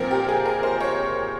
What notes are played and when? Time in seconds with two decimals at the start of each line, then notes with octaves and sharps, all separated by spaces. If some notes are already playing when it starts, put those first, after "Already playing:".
Already playing: A#2 F3 C4 A#4
0.11 G4
0.28 G#4
0.46 A#4
0.63 C5
0.80 C#5